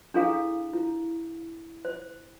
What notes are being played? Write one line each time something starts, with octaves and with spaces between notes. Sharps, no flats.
D4 E4 G#4 A4 F5
E4
C5